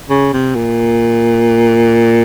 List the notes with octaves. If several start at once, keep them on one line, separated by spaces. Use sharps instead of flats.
C#3
C3
A#2